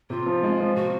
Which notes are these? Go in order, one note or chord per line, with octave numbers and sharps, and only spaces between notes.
C3 F4
F3
G#3
F3
C3 F#4